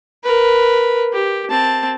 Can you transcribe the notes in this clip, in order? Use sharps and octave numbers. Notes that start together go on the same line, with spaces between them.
A#4 B4
G4
C4 A5